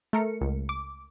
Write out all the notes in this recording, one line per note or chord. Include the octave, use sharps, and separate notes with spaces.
A3 A#4 C#7
C#2
D6